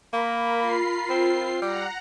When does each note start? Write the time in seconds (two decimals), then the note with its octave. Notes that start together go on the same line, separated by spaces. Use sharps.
0.13 A#3 A#4 B5
0.60 F4 C7
1.10 C4
1.62 G3 F#5 A#5